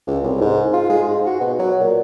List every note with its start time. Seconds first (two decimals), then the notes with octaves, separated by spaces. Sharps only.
0.07 C#2
0.23 C2
0.41 G#2
0.73 F4
0.89 G#3
1.08 G#2
1.26 F#4
1.40 B2
1.59 F#3
1.80 A#2